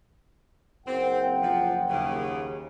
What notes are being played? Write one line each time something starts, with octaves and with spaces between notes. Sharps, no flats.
F#1 C4 F#5 G5
F3
D#2 C#3